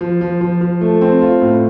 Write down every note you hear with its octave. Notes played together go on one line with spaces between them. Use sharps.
F3
F3
F3
F3
A3
C4
F4
A2